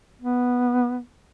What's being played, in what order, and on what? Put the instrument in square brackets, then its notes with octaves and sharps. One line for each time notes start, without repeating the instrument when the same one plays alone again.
[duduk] B3